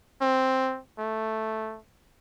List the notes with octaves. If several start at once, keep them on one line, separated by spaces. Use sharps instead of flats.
C4
A3